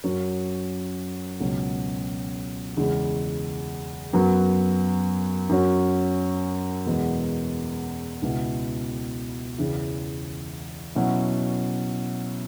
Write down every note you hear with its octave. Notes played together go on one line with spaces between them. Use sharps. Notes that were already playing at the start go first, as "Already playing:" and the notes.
F#2 F#3 C#4 F#4
C#2 B2 F#3 C#4
E2 C#3 G#3
F#2 F#3 B3 F#4
F#2 F#3 C#4 F#4
E2 B2 G#3 B3
C#2 B2 B3 E4
E2 C#3 E3
B2 F#3 C#4 E4